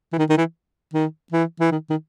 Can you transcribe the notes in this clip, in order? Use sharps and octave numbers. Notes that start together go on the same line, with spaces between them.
E3
D#3
D#3
E3
D#3
E3
E3
D#3
D#3